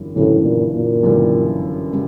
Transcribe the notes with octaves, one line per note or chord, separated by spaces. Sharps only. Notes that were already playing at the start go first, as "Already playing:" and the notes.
Already playing: G1 F#2 C#3 E3 G3
G1 F#2 A2 C#3 E3 G3
A#2
A#2
G1 F#2 C#3 E3 G3
C#3 G3